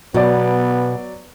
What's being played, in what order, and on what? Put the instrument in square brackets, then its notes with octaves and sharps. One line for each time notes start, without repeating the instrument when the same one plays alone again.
[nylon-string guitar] B2 [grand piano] F#3 D5 [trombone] B3